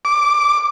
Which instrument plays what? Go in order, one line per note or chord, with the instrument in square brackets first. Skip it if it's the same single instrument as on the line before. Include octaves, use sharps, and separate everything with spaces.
[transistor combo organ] D6